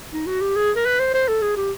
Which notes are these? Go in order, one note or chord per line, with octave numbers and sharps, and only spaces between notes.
D#4
F#4
G4
G#4
A#4
B4
C5
C5
A4
G#4
G4